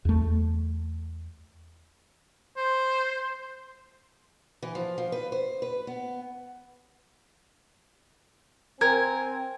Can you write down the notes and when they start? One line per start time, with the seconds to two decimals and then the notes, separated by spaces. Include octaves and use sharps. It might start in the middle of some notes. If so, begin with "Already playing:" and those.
0.05 E2 A3
2.57 C5
4.62 E3
4.75 F3
4.98 F3
5.12 B4
5.32 C5
5.62 B4
5.87 B3
8.81 C4 A#4 G#5 G#6